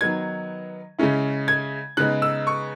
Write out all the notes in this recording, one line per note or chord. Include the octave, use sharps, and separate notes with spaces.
D#3 F#3 B3 D#4 G#6
C#3 G#3 C#4 E4
G#6
C#3 G#3 B3 D#4 F#6
E6
C#6